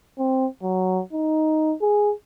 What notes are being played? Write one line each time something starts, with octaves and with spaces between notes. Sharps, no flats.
C4
F#3
D#4
G#4